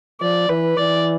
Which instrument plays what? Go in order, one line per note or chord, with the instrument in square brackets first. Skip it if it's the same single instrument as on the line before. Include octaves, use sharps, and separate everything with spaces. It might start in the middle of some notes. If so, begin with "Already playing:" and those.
[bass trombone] F3 [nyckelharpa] D5
[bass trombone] E3 [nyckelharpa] B4
[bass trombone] E3 [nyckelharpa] D5